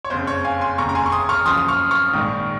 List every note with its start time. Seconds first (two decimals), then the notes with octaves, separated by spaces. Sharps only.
0.05 C#5
0.10 F#1 F2 C#3 C5
0.27 C#5
0.45 F5 G#5
0.61 G#5 C6
0.78 F1 D#2 C#3 A#5 C#6
0.89 A#5
0.95 G#5 C6
1.06 C#6
1.12 C6 D#6
1.29 C#6 F6
1.46 F#1 F#2 F3 C6 D#6
1.57 D#6
1.68 C#6 F6
1.91 C#6 F6
2.13 A#1 G#2 D#3